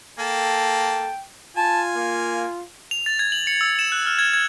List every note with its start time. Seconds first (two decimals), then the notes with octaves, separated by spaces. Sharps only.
0.19 A#3 A4 G5 A5
1.57 F4 G#5 A5
1.96 A#3
2.91 F7
3.06 A6
3.19 G#6
3.32 F#7
3.47 C#7
3.61 E6
3.79 E7
3.92 F#6
4.06 F6
4.19 G#6
4.33 G#6